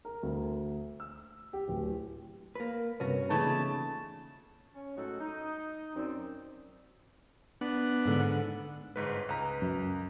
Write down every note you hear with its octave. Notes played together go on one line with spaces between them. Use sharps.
A#4
D2
E6
G4
D1
A#3 B4
G2 C3 C#4 F#4 B4
E2 A#2 C#3 A3 D#4 A5
C#4
A2 F#3 G#3 D#4 F#4 A4
D#4
F#2 C4 D5
B3 D4 F#5
G#2 D3
G1 G#2 B4
C#2 B4 A#5
F#2